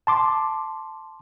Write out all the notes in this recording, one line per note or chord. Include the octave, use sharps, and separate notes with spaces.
A5 C6 D6